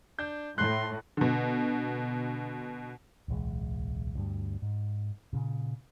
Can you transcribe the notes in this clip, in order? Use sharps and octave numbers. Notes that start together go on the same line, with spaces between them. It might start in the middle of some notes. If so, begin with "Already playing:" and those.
D4 G6
A2 C6 F#6
B2 D3
D1 B1 E3 G#3
D2 G2 G3
G#2
A#2 C#3